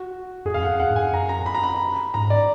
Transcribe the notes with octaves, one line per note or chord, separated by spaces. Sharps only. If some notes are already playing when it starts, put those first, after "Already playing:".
Already playing: F#4
F#2 G#4
F2 F5
F#2 F#5
F2 F#5
G#2
F#2 G#5
F#2 A#5
A#5
B5
A#5
B5
G#2 A#5
D5